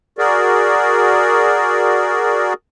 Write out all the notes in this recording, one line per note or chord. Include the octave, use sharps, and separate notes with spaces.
F#4 G#4 A#4 D5